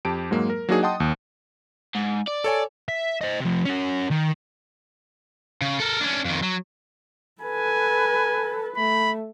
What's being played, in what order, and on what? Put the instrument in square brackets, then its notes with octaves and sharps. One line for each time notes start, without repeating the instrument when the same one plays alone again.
[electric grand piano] F2 G4 A5 D7
G#2 F#3 G#3 A#3
A#4
F#3 A#3 D4 D#4 F#4 G#4
D#5 F#5 G5 A5 C6 D#6
D#2
[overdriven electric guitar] G#2
D5
[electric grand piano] A4 C#5 G#5
[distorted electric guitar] E5
C5 D#5
C3 F3
C#4 F#4
D#3
[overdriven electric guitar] C#3
A4 A#4
C#4 D4
F2 D#3
F#3
[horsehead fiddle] A4 B4 [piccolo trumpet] G#5
[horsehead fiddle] A3 [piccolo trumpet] B5